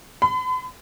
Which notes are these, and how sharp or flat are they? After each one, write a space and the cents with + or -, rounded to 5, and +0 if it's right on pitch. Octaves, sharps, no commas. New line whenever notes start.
B5 +45